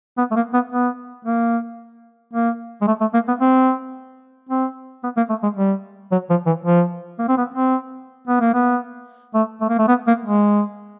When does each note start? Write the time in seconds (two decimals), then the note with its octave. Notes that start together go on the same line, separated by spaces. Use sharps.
0.18 B3
0.32 A3
0.36 A#3
0.54 B3
0.72 B3
1.25 A#3
2.33 A#3
2.81 G#3
2.87 A3
3.01 A3
3.14 A#3
3.28 B3
3.41 C4
4.49 C4
5.03 B3
5.17 A#3
5.30 A3
5.43 G#3
5.57 G3
6.12 F#3
6.30 F3
6.46 E3
6.65 F3
7.19 A#3
7.28 C4
7.38 B3
7.54 C4
8.27 B3
8.41 A#3
8.54 B3
9.35 A3
9.61 A3
9.69 A#3
9.78 A3
9.88 B3
10.07 A#3
10.24 G#3